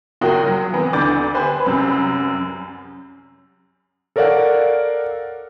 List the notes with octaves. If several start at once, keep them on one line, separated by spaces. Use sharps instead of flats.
F#1 A#3 F4 F#4 G5 D#6
F#3
E3 B3 C4
D2 D3 D6 G6 A6
G4 B4 C5 G#5 B5
C2 F#2 B5
A4 A#4 C#5 D5 F5 F#5